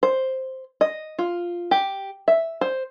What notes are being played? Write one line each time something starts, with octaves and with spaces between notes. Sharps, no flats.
C5
D#5
F4
G4
E5
C5